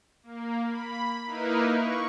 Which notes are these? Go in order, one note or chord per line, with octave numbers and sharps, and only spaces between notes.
A#3
B5
A#3 D#4 E4 A#4 B4
C#6